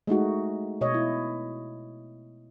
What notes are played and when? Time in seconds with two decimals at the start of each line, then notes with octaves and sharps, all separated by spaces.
0.07 G#3 A3 D#4 F#4
0.81 B2 C#5 D#5
0.94 E4